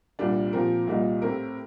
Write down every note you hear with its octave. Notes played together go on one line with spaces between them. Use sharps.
C2 A#2 G3 D4
A#2 F3 C4 G4 A#4
C2 A#2 G3 A#3 D#4
A2 A3 C4 G4 A#4